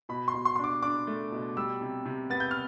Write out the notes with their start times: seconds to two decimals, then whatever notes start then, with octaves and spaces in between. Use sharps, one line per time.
0.09 B2 B5
0.28 C6
0.34 B2
0.45 C6
0.56 D4 C6
0.64 D6
0.82 D4 D6
1.07 A3
1.32 B2
1.57 G3 E6
1.81 C3
2.06 C3
2.30 B3 A6
2.40 G6
2.51 F6